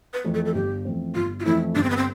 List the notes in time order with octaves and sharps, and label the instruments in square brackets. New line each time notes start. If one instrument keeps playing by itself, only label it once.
[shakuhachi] B4
[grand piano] F2 E3 A3 C4
[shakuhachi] A4
A4
[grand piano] G1 [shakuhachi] G4
[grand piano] F2 E3 A3 C4
[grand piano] G1 [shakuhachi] F4
[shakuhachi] F4
[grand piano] F2 E3 A3 C4 [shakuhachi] E4
[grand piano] G1 [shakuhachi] D4
[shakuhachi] C4
B3
C4